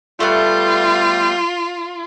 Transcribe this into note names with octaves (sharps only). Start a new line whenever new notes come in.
G3 A3 B3 F4